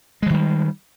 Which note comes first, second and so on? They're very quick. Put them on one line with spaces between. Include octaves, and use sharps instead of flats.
G#3 E3 D#3 G3